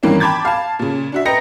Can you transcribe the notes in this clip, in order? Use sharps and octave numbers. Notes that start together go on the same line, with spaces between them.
G2 D#3 E3 A#3 C4 C#4
G5 A5 B5 D6 G#6 A6
F5 A5
A#2 C#3
D4 F#4 E5
B4 D#5 G5 A#5 A#6 C#7